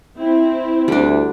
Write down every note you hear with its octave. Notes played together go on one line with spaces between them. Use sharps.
C4 E4
D2 G3 D4